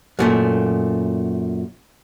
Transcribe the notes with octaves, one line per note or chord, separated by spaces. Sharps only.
F#2 A#2 A3